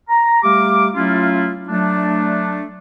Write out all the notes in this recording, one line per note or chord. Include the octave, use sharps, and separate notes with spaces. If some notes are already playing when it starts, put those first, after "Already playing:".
A#5
G3 A3 G4 F5 D6
F#3 A3 C#4 E4 F4
F#3 A3 D4